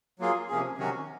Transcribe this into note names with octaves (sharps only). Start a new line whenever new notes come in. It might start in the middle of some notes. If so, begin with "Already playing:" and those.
F#3 A#3 F4 G#4
C3 F3 A#3 C#4 G#4
C3 D#3 F#3 C#4 F#4